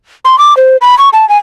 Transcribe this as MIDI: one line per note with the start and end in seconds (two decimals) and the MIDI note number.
0.25 0.38 84
0.39 0.56 86
0.57 0.77 72
0.81 0.97 83
0.98 1.09 85
1.13 1.27 81
1.29 1.37 80